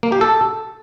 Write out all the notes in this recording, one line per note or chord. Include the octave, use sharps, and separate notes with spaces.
A#3
G4
A4